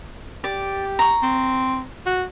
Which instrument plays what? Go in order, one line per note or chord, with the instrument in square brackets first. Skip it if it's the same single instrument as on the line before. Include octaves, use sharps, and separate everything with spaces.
[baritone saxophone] G4 [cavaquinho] D5
[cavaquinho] A#5 C#6
[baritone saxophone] C4
F#4